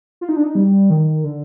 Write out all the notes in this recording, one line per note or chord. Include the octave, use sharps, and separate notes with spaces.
F4
D#4
D4
D#4
G3
D#3
D3